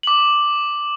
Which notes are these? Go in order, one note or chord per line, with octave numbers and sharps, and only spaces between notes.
D6 F#7